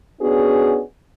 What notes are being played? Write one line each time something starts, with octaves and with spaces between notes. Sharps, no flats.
B3 C#4 D4 F#4 G#4